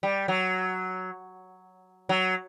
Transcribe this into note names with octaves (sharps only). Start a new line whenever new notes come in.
G3
F#3
F#3